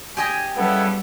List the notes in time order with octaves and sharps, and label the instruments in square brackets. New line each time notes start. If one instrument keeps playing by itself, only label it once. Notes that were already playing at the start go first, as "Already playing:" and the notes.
[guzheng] G4 D#5 G5 [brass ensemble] G#5
[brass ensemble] C#3 E4 A4 [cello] G3 [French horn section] B3